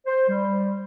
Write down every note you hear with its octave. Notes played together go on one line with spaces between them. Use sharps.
C5
G3